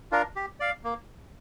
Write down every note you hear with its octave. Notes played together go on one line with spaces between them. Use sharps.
D4 F4 A#4
G4
D5 F5
A#3